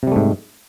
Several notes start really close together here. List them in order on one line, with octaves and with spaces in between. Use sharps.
C3 G3 A3 G#2